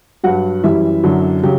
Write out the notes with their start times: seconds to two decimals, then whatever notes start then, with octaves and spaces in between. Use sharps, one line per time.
0.24 G2 F#3 F#4 F#5
0.63 F#2 E3 G3 E4 E5
1.04 F#2 D3 F#3
1.43 C#3 F#3 G4